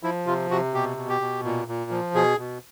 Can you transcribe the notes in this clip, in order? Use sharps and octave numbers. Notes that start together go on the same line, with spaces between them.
F3 E4
C3 F4
C3 F#4
B2 G4
B2
G4
B2
A#2
A#2
F3
B2 G#4
B2